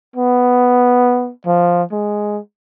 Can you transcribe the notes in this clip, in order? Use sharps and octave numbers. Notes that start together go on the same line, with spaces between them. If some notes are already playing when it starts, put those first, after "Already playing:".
B3
F3
G#3